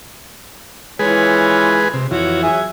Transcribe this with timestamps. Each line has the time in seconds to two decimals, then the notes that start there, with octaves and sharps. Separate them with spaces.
0.99 E3 G#3 F4 G#4 B4 C#5
1.94 C3
2.11 F2 E3 F#4 C#5
2.43 F#3 G#4 E5